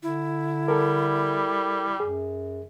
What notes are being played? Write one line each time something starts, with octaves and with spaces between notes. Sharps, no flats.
D3 E4
G3 A4 A#4
F#2 G#4